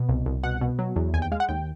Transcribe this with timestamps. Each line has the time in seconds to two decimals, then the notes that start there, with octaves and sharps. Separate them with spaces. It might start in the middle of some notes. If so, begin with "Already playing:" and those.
Already playing: B2
0.09 C2
0.26 C2
0.44 B2 F#5
0.61 B2
0.79 F#3
0.96 E2
1.14 D#2 G#5
1.22 G5
1.32 G#3 F5
1.40 F#5
1.49 D#2 G5